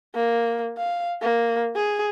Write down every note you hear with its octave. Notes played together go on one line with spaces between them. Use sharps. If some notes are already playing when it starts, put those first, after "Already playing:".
A#3
F5
A#3
G#4